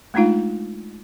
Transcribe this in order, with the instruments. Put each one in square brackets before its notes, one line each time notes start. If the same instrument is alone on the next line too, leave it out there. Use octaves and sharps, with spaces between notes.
[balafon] G#3 A3 D4 D#4 F4 F5